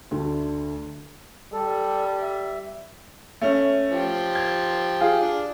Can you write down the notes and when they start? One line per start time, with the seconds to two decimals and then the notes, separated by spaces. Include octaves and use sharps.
0.11 D2 D3 A3
1.53 G3 A4
2.22 E5
3.41 A3 C#4
3.91 F3 G4
4.35 G#6
5.00 F4 G#4
5.21 D4